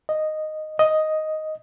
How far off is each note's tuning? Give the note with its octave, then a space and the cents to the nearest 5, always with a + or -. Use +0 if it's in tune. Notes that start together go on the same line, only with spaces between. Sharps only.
D#5 -5
D#5 +5